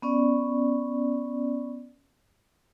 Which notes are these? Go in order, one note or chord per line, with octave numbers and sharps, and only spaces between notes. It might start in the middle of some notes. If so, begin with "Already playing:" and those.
B3 C#4 D5